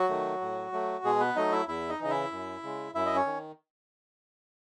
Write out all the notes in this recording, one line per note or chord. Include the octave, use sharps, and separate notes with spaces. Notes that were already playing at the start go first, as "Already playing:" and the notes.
Already playing: F#3 F#4
D#3 A3
A2
F#3 A3
B2 G#3 G#4
B3 B4
F#3 A3 D#4 D#5
E4 E5
E2 E4 E5
D#4 D#5
C#3 E3 D#5
E4 E5
F#2
C#3 G#3
F#2 E4 E5
D#5
C#4 C#5
D#3